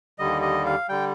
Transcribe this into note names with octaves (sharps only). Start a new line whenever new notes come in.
D#2 D3 G3 D#5
D#5
F5
D3 G3 G5